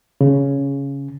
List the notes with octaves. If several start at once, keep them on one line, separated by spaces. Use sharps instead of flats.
C#3